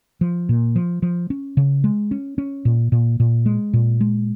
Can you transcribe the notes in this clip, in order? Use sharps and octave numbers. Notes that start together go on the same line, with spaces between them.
F3
A#2
F3
F3
C#4
C#3
G#3
C#4
C#4
A#2
A#2
A#2
G#3
A#2
G#3